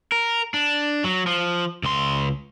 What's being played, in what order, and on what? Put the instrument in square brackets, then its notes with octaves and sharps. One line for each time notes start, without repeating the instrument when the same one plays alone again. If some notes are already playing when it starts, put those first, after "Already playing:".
[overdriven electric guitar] A#4
D4
F#3
F3
C#2 C6